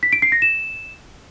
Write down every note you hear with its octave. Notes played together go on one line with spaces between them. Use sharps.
B6
D7
C7
A#6
E7